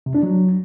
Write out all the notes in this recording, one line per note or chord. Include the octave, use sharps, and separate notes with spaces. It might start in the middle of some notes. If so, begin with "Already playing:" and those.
C3
D4
F#3